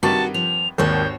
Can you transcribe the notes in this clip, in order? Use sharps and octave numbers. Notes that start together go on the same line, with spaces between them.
G2 C3 D#3 F#4 A5
F3 F7
G#1 D#2 F#4 C5 C#5 G6